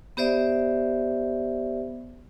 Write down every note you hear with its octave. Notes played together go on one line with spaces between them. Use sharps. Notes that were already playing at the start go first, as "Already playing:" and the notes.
B3 G4 C5 D5 E5